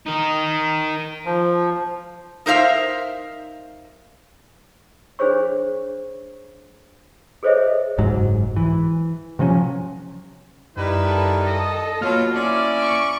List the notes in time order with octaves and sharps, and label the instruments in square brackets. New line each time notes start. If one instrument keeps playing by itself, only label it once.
[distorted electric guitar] D#4 A#4
[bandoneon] F3
[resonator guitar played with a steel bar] D#4 A#4 C5 E5 F5
[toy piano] D4 G#4 C5 C#5 C#6
G#4 A4 C5 C#5 D#5 E5
[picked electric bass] F#1 C2 G#2 F#3
E3
C3 F3 F#3 C#4
[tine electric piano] F#2 [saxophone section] D#3 G3 E4 [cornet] B4
[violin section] A4
[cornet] D#5
[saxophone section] B2 F#3 [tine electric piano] A#3 F6 [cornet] F4
[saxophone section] C#4 E4 [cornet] D5
[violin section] C#6 D7